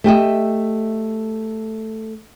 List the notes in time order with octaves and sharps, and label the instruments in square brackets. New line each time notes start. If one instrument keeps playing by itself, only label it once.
[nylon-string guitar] A3 G4 D#5 E5